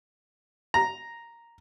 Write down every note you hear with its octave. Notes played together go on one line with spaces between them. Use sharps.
A#5